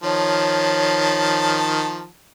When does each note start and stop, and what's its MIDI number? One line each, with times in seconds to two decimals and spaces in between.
0.03 2.07 51
0.03 2.07 53
0.03 1.58 73
0.03 2.07 81